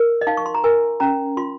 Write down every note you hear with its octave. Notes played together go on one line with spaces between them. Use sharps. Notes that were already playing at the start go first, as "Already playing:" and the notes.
Already playing: A#4
D#5
D#4 F5
C#6
C6
A#5
A#4 G#5
C#4 A#5
F4 C6